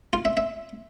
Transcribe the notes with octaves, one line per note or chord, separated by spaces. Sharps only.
F4
E5
E5